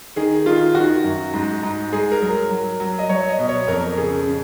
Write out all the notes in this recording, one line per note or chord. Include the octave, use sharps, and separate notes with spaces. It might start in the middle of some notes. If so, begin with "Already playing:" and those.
D#3 G#4
D#3 F4
D#3 F#4
F#2
G#2
G#2
G#2 G#4
A#4
F#3
A#4
F#3
F#3
D#5
F#3 C#5
D#5
B2
C#5
F2 A#4
C#3 G#4
C#3